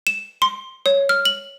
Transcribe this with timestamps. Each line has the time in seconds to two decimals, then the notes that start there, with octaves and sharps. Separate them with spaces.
0.07 E7
0.42 C6
0.86 C#5
1.09 F6
1.25 F#7